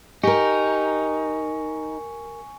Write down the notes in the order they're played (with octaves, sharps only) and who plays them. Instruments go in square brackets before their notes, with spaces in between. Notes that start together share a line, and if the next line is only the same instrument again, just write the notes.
[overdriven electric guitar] D#4 [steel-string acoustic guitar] G4 A#4 [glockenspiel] G#5 C#6 C#7